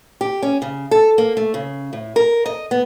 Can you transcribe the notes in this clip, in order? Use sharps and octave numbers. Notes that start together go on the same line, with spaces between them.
G4
C#4
C#3
A4
A#3
A3
C#3
A2
A#4
D#5
B3